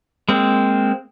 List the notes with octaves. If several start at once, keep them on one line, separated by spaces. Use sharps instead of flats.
G#3 A#3 C4